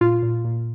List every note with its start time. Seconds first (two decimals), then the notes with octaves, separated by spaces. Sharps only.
0.01 A#2 F4
0.23 A#2
0.44 A#2